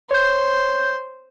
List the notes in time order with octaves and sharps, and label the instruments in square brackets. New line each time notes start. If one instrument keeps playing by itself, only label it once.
[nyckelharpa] C5 [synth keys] C#5 G6